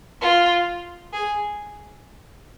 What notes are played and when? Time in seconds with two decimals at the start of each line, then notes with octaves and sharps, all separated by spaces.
0.21 F4
1.13 G#4